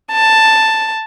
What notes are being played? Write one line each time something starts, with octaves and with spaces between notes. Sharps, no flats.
A5